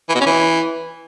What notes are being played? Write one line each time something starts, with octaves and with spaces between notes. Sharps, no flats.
E3
B2
C#4
E3